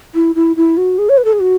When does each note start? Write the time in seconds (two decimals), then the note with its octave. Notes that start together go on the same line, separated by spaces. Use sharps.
0.15 E4
0.35 E4
0.56 E4
0.77 F#4
0.98 G#4
1.09 C#5
1.17 B4
1.25 A4
1.33 G#4
1.40 F#4